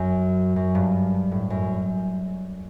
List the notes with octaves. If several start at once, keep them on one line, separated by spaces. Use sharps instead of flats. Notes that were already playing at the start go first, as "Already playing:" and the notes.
Already playing: F#2
F#2
G2
A2
F#2